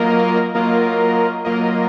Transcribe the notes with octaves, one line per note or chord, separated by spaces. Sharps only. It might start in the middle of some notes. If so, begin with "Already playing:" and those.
Already playing: F#3 A#3 F4 A#4 D#5
F#3 A#3 F4 A#4 D#5
F#3 A#3 F4 A#4 D#5